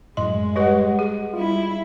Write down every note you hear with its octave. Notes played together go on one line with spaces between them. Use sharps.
F#2 A2 G#3 D#5 C6
G3 G4 B4 D#5 F#5
G#4
G3 E4 F4